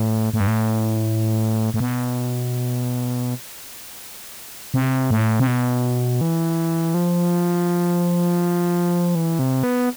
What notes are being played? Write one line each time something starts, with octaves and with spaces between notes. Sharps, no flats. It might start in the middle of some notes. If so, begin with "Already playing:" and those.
Already playing: A2
A2
G2
A2
A2
B2
C3
A2
C3
B2
E3
F3
E3
C3
B3